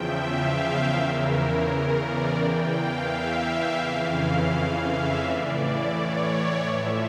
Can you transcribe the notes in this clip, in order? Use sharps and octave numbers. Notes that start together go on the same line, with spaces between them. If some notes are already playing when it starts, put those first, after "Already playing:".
Already playing: E2 C#3 F3 E5 G5
F5
E2 C#3 E3 A#4
D5
E2 E3 G5
F5
E5
F2 C#3 E3 F5
E5
A2 E3 D5
C#5
A2 F3 E5